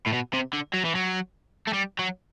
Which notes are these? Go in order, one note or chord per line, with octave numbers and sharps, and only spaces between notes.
A2
B2
C3
D3
F#3
E3
F#3
A3
G3
F#3